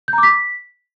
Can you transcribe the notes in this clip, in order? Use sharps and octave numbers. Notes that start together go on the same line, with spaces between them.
G6
A#5
D6
B6